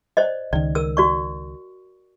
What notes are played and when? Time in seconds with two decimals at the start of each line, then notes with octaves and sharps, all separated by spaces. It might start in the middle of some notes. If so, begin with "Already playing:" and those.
0.17 C5 D5 D#5
0.53 C#2 D#3 D5
0.75 A#4 E6
0.97 F#4 D5 C#6